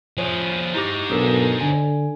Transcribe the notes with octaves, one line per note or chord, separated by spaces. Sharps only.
F3 G#4 C5 C#5
D#4 E4 G4 C5 D6
B1 D4 A4 A#4
D3 G#5